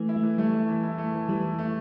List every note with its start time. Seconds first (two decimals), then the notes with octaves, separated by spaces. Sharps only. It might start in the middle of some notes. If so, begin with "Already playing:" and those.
Already playing: E3 A3
0.09 E4
0.16 A3
0.23 E3
0.38 G3 A3
0.54 A3
0.69 E3
0.83 E4
0.98 A3
1.14 E3
1.29 E3 G3
1.43 E3
1.59 A3